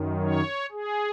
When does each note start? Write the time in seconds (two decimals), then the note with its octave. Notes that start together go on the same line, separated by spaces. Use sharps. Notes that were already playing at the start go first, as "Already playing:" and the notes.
Already playing: F#2 D#3
0.23 C#5
0.72 G#4